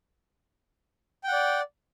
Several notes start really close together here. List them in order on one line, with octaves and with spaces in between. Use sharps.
G5 F#5 D5